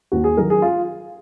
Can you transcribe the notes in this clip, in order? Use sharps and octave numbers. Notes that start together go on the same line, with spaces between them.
D#2 F#4
G#4
D#3 F#3 A#4
G#4
F4